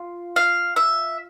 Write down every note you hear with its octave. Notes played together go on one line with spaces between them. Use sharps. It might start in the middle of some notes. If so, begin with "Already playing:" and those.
Already playing: F4
F5
E5